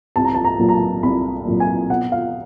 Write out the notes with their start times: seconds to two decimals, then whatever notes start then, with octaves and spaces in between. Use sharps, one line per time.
0.16 C2 A5
0.25 A#5
0.35 A5
0.45 A#5
0.59 A#2 F#3 A#3
0.69 A#5
0.74 A5
1.03 C2 B5
1.46 A#2 F#3 A#3
1.60 G#5
1.89 B2 F#5
2.12 F5